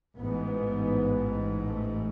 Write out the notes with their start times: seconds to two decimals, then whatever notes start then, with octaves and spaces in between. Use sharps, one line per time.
0.16 A1 G#2 B3
1.67 A3